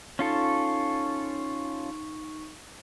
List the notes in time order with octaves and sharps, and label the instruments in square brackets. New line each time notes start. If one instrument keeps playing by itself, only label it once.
[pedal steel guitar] C#4 F4 A4 [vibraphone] D#4 C#6